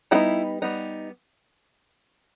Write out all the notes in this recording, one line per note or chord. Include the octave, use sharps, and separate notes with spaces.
G3 B3 D#4 E4 F#4
G3 B3 D#4